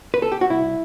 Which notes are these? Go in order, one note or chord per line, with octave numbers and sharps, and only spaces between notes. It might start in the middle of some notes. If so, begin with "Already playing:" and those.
B4
A4
G4
F#4
C2 E4